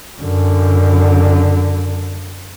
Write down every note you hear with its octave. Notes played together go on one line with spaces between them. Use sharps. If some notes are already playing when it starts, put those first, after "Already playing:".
F#2 D3